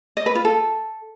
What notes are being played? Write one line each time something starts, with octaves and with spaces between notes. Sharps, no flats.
D#5
B4
F4
A4